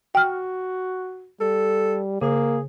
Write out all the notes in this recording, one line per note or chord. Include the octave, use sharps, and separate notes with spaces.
F#4 G5 F6
G3 A4
C#3 A#3 G#4